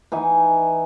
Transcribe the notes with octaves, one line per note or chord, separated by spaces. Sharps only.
E3 D#4 G#5